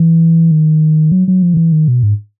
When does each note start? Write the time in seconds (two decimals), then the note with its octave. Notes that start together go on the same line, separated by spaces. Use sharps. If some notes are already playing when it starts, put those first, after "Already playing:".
Already playing: E3
0.51 D#3
1.12 F#3
1.28 F#3
1.43 F3
1.54 D#3
1.57 E3
1.72 D#3
1.88 B2
2.03 G#2